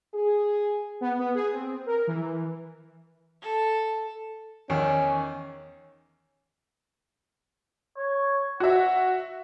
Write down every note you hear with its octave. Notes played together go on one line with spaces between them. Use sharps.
G#4
B3
B3
G#4
C4
A#4
E3
A4
E2 D#3 C#4
C#5
F#4 E5 F#5